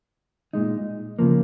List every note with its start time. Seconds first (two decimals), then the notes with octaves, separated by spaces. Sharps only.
0.53 A#2 G#3 D#4
1.19 C#3 F3 A#3